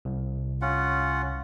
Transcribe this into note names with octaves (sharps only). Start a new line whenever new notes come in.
C2
C#4 F4 F#5